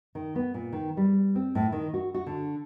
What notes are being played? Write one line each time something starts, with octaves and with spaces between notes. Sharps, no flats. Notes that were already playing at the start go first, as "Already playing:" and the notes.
D#3
B3
A#2
D#3
G3
C4
A2
D#3
F#4
F#4
D3